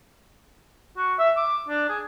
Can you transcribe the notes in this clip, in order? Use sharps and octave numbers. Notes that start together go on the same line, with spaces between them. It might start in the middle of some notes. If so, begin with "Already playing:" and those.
F#4
E5
D6
D4
G#4